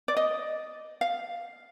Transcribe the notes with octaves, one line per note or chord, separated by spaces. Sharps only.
D5
D#5
F5